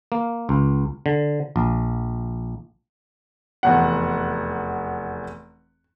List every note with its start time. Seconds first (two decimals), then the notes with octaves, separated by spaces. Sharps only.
0.12 A#3
0.49 C#2
1.06 D3
1.56 A#1
3.63 F1 E2 F#5